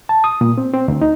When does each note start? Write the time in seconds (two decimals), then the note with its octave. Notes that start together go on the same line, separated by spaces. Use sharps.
0.09 A5
0.24 D#6
0.41 A#2
0.58 C4
0.73 C4
0.88 D2
1.01 D#4